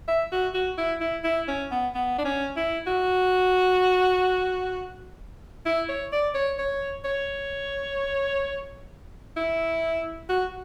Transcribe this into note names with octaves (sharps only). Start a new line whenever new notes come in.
E5
F#4
F#4
E4
E4
E4
C#4
B3
B3
D4
C#4
E4
F#4
E4
C#5
D5
C#5
C#5
C#5
E4
F#4